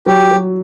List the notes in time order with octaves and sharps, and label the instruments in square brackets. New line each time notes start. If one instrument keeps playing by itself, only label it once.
[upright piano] F#3 [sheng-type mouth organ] G4
[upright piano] F#3